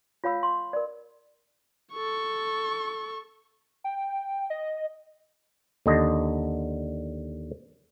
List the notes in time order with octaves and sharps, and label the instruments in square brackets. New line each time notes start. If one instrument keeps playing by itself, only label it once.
[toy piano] F4 C#5 F5 B5 E6
C6
A#4 D5
[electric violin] A4 C#6
[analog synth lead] G5
D#5
[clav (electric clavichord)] D#2 D3 D#5